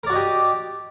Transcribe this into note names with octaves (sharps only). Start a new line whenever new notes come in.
F#4 G4 A#4 D5 D#5